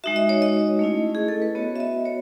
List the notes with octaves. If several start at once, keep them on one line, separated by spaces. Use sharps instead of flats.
G#3 D#4 F#4 E5
D#5
C#5
D#5
A3 C#4 E4
G#4
A4
B4
B3 F#4 C#5
E5
D#5
C#5